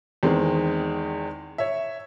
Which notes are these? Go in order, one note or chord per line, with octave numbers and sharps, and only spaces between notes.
E2 D#3 G#3 C4
C#5 E5